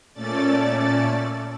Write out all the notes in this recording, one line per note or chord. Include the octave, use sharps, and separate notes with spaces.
A#2 A3 C#4 A4 D5 A6